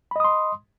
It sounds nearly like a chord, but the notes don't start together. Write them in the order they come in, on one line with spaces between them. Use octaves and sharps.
B5 D#5 D#6 C6